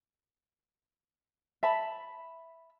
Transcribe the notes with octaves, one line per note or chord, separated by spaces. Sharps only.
E5 A5 B5